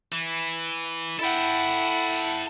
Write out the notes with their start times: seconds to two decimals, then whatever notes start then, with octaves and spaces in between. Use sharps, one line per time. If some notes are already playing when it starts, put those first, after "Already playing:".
0.13 E3
1.19 E4 A4 F#5 G5